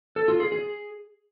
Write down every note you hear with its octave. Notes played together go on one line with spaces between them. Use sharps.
A4
F4
G#4
G#4